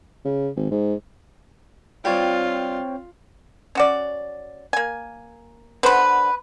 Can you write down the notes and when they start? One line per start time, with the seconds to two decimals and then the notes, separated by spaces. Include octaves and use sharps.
0.25 C#3
0.56 G#1
0.71 G#2
2.05 G3 C4 F4 C#5 G5
3.75 C#4 F#4 D5
4.73 A#3 G#5
5.83 D3 B4 C5 F#5 B5